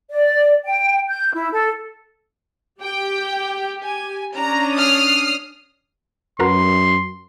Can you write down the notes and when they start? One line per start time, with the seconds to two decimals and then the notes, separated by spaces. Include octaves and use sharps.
0.10 D5
0.65 G5
1.09 G6
1.34 E4
1.52 A4
2.82 G4 G5
3.83 G#5
4.36 C#4 D4 A#5
4.76 D#6 F6 C7
6.40 F#2 F#4 A#4 B4 C6